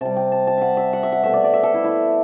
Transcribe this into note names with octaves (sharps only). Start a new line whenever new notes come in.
C3 G3 A5
G5
A5
A5
E5 F#5
E5
F#5
E5
F#5
B2 A3 E5
D5
D5
E5
A4
E4
E4